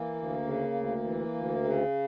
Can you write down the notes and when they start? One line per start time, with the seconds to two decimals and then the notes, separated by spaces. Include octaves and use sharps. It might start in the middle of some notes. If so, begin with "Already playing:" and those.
Already playing: E3 A#3
0.15 D2
0.45 C#3
0.74 D2
1.04 E3
1.34 D2
1.63 C#3